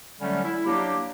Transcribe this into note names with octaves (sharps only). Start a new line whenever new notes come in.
D3 F#3 G3 A3 C#4
E4
F#3 A#3 D4 G4